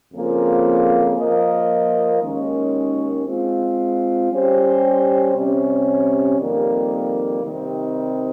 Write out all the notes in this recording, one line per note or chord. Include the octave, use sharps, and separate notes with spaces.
F2 C#3 F3 A#3 F4
F3 A#3 F4 A#4 D#5
D#2 D#3 G#3 C#4
G#3 C4 F4
G3 C#4 G4 C5
C3 G3 C#4
F2 D#3 G3 A#3
C3 D#3 G3 C4 D#4